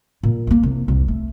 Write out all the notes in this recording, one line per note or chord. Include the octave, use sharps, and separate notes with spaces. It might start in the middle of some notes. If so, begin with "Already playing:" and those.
A#2
G#3 A#3
C2
C2 F2
A3